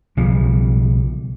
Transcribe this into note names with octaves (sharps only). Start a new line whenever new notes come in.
B1 C#3 F3 G3